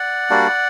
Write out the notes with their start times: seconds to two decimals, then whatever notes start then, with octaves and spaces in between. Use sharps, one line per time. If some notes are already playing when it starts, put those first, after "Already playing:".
Already playing: D5 F#5
0.30 G3 A#3 D4 F#4